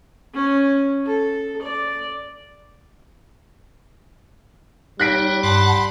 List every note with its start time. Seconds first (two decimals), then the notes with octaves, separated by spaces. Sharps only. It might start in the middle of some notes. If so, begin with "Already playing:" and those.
0.34 C#4
1.06 A4
1.62 D5
5.00 G3 D#4 C#5 F#6 B6 D7
5.43 G2 F#5 A5 B5 C6